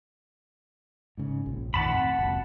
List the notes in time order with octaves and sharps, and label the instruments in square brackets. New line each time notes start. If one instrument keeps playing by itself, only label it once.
[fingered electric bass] G#2 C#3
A#1
[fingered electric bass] F2 A2 D#3 [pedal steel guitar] F#5 A5 B5
[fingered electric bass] C4
F#1 C#2